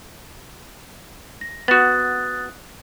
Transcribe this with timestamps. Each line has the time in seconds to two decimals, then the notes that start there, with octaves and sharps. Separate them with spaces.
1.41 A#6
1.68 B3 F#4 D#6 F#6 A6